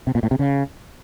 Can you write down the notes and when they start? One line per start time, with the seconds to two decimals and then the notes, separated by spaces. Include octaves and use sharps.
0.07 C3
0.15 A#2
0.23 A2
0.31 C3
0.39 C#3